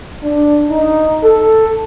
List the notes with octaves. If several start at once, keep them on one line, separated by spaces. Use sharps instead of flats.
D4
D#4
A4